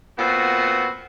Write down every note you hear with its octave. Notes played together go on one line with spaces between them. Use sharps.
A#2 B3 C4 F#4